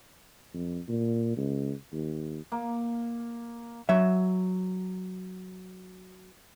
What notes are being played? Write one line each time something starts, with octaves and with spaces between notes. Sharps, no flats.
F2
A#2
C#2
D#2
A#3
F#3 E5